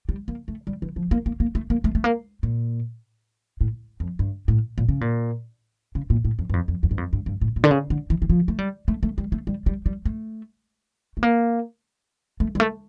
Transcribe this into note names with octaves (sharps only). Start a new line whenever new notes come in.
G3
A#3
A3
G3
E3
F3
A#3
A#3
A#3
A3
A#3
A3
A3
A#3
A#2
A2
F2
G2
A2
A#2
C#3
A#2
C#3
A#2
A2
F2
G2
F2
F2
E2
G2
F2
G2
G2
A2
A#2
D3
C#3
D3
E3
E3
F3
A3
G3
A3
A3
G3
A3
G3
G3
G3
A3
A3
A#3
A3
G3
A3